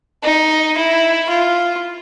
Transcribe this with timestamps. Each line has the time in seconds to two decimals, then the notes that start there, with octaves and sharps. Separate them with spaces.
0.23 D#4
0.77 E4
1.29 F4